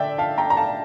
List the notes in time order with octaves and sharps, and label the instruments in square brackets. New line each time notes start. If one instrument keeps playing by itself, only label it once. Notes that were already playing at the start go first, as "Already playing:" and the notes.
Already playing: [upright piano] D3 D5 E5 G5
F5 A5
G5 A#5
A#5
F5 A5